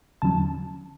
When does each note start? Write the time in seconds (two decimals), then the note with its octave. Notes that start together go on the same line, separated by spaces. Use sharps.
0.22 E2 D3 F#3 C#4 A5